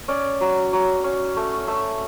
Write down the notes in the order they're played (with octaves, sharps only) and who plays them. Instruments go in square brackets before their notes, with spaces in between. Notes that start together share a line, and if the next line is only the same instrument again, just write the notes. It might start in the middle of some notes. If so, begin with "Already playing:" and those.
[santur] C#4 D5
F#3
F#3
C#4
A3
A3 E5